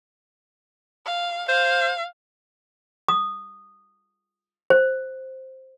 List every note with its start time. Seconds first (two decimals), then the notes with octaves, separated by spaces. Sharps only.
1.06 F5
1.49 C5 F5
3.08 D#6
4.70 C5